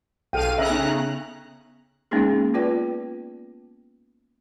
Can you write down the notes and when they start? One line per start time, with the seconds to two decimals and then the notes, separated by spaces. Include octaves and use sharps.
0.33 B1 A4 F5 G5 D#7
0.58 C#3 E5 A#5 F#6
0.70 B3
2.11 G#3 A#3 B3 C#4 D#4 G#4
2.54 B3 F4 B4 D5 G5